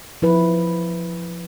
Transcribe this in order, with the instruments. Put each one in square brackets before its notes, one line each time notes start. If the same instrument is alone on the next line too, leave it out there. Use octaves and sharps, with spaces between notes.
[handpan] F3 E4 B4